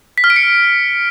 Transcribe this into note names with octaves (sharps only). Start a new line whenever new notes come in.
B6
F6
D7
C#7